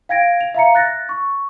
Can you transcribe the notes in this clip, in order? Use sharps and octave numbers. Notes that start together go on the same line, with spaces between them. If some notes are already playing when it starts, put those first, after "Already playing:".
F5 G5 G#6 A#6 D7
F7
E5 F5 A#5 C#7
F#6 A6 A#6
C#6